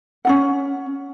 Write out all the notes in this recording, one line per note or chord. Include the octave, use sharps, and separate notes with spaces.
C#4 D#4 F#5